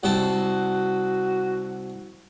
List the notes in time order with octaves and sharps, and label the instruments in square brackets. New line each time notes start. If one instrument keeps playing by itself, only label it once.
[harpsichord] C2 C4 A5 [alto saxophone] F#4